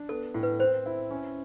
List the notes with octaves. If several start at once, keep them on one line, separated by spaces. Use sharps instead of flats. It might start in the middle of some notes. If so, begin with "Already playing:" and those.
Already playing: D4
B3 A4
A2
B4
C4 C5
E4
C#4